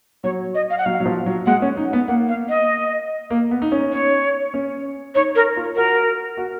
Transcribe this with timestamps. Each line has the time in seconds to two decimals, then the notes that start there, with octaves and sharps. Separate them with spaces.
0.24 F#3 C#5
0.55 D#5
0.70 F5
0.78 F#5
0.86 F#3 F5
1.00 F#3
1.06 F3
1.26 F#3
1.46 G#3 F#5
1.62 C#4
1.77 D#4
1.93 B3
2.08 A#3 F#5
2.29 F5
2.49 D#5
3.30 A#3
3.51 B3
3.62 D#4
3.72 C#4
3.92 C#5
4.54 C#4
5.15 D#4 C#5
5.36 A#4
5.57 F4
5.76 F#4 A#4
6.37 F#4